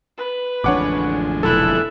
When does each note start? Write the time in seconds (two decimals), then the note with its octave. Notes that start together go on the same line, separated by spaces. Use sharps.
0.18 B4
0.64 A1 F2 D3 G#3 D4 C#5 F#5 D6
1.43 F1 B1 E4 A4 E5 F#6